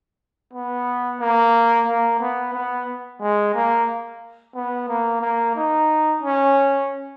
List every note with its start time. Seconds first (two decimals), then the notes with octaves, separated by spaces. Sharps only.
0.53 B3
1.20 A#3
1.87 A#3
2.20 B3
2.54 B3
3.21 G#3
3.54 A#3
4.55 B3
4.88 A#3
5.22 A#3
5.56 D#4
6.22 C#4